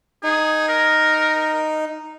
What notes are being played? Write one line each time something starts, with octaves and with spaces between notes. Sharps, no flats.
D#4 G#4
A#4